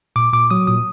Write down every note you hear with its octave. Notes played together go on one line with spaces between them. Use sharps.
A#2 D6
A#2 D6
F#3 D#6
A#2 D#6